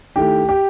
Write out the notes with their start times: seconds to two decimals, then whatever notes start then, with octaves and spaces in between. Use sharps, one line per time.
0.16 D#3 A3 E4 G4
0.49 G4